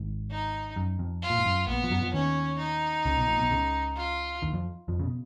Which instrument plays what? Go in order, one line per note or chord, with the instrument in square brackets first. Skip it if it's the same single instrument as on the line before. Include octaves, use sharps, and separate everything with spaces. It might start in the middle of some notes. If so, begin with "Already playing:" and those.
Already playing: [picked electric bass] G#1 G#2
[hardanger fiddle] D#4
[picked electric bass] F#2
F2
[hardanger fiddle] F4
[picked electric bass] A#2
G#2
F#2
[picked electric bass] A#1 A#2 [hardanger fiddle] B3
[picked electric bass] F3
F#2 F#3
F2 F3
[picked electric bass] D#2 D#3 [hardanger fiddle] C#4
[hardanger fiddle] D#4
[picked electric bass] C#2 C#3
B1 B2
A#1 A#2
B1 B2
C#2 C#3
[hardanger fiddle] F4
[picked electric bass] D#2 D#3
F2 F3
F2 F3
C#3
B2